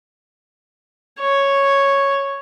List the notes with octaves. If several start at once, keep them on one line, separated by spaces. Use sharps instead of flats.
C#5